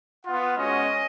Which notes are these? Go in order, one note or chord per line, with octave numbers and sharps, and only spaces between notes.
B3 F4 F#5
G#3 C#4 F#4 D#5